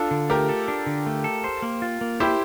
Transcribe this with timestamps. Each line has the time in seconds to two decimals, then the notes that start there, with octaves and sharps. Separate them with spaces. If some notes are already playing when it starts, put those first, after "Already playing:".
Already playing: D4 F4 A4
0.11 D3
0.30 A3 G4 A#4
0.49 A4
0.68 D4
0.87 D3
1.06 A3
1.24 A4
1.44 C5
1.62 A#3
1.82 F4
2.01 A#3
2.20 E4 G4 C5